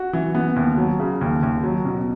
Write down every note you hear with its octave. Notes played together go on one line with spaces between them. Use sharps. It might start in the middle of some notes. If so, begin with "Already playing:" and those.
Already playing: F#4
E3
B3
D#2
F#3
C#3
D#2
D#2
F#3
B2